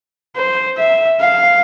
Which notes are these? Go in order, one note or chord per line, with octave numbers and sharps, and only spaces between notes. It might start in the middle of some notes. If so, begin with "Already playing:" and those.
C5
E5
F5